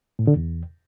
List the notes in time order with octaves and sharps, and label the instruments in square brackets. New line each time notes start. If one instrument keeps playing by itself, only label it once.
[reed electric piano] A2
D3
E2